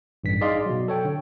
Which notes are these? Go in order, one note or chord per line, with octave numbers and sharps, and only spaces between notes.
A1 G2 B6
D#4 G#4 D5 D#5 F5 C6
B2 F#3
A4 C#5 G5
D3